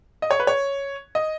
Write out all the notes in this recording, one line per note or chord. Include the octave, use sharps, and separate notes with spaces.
D#5
C#5
B4
C#5
D#5